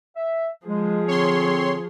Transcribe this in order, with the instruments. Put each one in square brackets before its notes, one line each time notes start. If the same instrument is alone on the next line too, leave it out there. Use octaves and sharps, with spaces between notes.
[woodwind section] E5
[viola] F3 G#4 [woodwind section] G#3
[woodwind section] D3 C4 [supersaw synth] C#5 C6